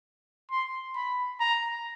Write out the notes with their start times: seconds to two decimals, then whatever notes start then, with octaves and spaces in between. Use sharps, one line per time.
0.51 C6
0.96 B5
1.40 A#5